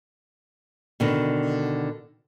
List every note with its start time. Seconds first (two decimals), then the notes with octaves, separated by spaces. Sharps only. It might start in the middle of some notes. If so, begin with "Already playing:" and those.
1.00 B2 D3 D#3